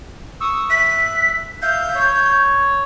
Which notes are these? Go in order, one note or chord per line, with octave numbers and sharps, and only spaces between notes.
C#6 D#6 E6
E5 F#6 B6
E5 F5 G6
C#5